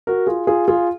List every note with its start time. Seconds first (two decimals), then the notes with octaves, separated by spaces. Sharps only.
0.07 F#4 A#4
0.27 F4 G#4
0.47 F4 G#4
0.68 F4 G#4